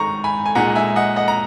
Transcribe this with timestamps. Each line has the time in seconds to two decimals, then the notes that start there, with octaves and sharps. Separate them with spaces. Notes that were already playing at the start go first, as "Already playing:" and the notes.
Already playing: G#2 D#3 G#3 A#5 C#6
0.24 G#5 B5
0.46 G#5
0.55 A#2 G#3 D#4 F#5 A#5
0.76 E5 G#5
0.96 D#5 F#5
1.16 D#5 F#5
1.28 A#5